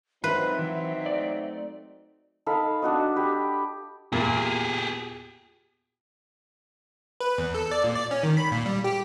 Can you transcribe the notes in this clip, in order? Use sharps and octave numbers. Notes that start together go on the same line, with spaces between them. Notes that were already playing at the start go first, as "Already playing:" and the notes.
F#3 C4 D#4 F4 B4 E5
E3
A3 D5
D#4 A4 F5 B5
D4 F#4 D#5
G4 B5
E2 A#2 G4 G#4
B4
E2
A4
D5
A#2
D5
C#4
D#3
B5
A#2
G3
G4